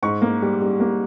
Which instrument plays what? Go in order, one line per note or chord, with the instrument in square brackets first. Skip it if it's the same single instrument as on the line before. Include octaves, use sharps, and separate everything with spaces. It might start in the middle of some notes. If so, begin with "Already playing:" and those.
[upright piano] G#2 C#6
A#3
G3
G3
A#3